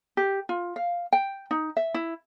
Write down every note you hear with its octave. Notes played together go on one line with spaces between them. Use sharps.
G4
F4
F5
G5
D#4
E5
E4